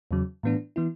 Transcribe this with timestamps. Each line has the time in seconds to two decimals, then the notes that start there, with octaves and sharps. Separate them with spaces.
0.11 E2 C#3 F#3
0.43 A2 E3 B3 D4
0.76 E3 B3 E4